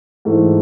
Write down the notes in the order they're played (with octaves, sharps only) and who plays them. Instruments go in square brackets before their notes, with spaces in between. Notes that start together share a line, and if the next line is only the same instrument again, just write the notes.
[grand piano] G#2 E3 A3